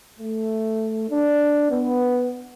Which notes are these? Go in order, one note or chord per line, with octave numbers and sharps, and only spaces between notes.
A3
D4
B3